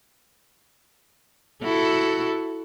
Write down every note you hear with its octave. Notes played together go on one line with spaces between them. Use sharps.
E4 F#4 A4